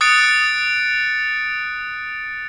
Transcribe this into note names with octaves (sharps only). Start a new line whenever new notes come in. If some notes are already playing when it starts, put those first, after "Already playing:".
D#6 F#6 A6 C#7 D7